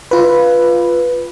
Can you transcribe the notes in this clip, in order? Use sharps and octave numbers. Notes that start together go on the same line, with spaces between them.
F4 B4